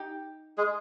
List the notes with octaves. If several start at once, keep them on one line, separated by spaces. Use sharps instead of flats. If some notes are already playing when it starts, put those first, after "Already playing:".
Already playing: D#4 G4
G#3 G#4